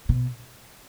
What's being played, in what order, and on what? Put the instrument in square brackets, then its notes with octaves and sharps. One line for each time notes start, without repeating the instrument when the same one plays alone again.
[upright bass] B2